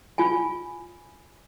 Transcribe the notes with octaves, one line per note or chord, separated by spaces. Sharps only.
F4 G#5